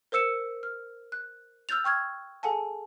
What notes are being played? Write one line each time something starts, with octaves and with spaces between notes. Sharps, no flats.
A#4 C5 E6 C#7 E7
F6
F#6
E6 F6 G6 A6 F7
G5 C#6 F6 G#6
G#4 A4 F#5 G#5 A5